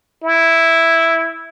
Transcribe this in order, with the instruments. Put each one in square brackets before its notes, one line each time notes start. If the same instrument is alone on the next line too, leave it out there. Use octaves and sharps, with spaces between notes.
[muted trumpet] E4